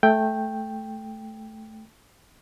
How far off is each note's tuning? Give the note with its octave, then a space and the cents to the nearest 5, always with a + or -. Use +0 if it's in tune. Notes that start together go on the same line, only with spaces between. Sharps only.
A3 -10 G5 +5